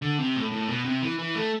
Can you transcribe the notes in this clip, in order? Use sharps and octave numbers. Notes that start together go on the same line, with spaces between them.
D3
C3
A2
A2
B2
C3
E3
E3
A3